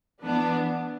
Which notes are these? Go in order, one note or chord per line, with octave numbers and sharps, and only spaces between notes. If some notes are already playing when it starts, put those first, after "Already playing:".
E3 B3 D4